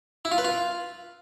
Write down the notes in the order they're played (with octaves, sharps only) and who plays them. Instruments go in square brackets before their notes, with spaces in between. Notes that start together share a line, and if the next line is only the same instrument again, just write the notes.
[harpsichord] E4
F4
B4
F4